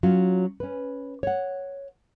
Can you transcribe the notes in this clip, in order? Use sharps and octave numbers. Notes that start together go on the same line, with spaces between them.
F#3 C#4 F4
C#4 B4
C#5 F#5